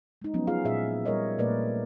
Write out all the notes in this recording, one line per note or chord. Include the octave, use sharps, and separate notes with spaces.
G#3 D#4
F3 F#3 B3 C#4
F4 G#4 F5
A#2 G#4 E5
G3 A#4 C#5 D#5
A#2 A3 A#3 A#4 B4 D5